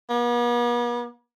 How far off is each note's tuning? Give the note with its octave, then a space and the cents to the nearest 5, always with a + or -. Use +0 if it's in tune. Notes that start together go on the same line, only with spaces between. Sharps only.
B3 -45